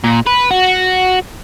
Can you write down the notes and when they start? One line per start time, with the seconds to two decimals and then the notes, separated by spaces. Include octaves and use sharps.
0.04 A#2
0.27 B4
0.51 F#4